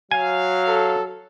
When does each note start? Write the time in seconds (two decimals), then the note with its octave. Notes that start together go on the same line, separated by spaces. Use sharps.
0.11 F#3 F5 G#5
0.67 A4